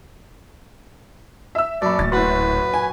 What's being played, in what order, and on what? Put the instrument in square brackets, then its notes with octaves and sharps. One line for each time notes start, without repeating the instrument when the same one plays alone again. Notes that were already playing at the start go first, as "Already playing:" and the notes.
[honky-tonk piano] E5 E6
[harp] F#2 A#2 [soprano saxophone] D5 [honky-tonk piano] A5 B5
[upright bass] D1 [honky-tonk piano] A6
[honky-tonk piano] A2 C6 [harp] F#4 F#5 [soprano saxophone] B4
[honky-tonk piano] G#5